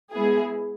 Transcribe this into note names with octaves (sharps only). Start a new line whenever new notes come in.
G#3 B3 E4 G#4